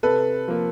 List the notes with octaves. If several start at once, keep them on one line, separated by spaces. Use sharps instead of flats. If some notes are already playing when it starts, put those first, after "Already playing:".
C3 A4 B4
F3 A#3